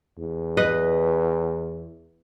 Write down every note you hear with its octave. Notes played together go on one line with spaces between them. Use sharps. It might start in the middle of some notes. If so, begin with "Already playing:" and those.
E2
B4 D#5